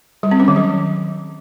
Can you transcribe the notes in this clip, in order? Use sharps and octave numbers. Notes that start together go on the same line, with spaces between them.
G3
C4
C#4
D#3
F#3